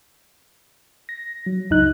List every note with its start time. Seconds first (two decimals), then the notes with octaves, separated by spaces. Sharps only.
1.09 A#6
1.46 F#3
1.70 C#2 F#2 D#4 F#6